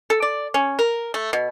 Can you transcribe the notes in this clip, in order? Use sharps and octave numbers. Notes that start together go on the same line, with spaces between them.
A4
D5
C#4
A#4
A3
B2